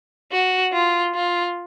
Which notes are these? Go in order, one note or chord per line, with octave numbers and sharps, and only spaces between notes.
F#4
F4
F4